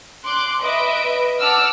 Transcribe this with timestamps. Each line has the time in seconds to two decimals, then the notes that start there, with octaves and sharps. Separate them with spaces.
0.23 C6 D6 F#6
0.61 B4 D#5 E5 D7
1.40 F#5 A5 D6 E6 F6